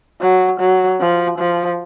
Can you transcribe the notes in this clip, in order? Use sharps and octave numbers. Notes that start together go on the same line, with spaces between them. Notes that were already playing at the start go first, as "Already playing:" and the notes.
F#3
F#3
F3
F3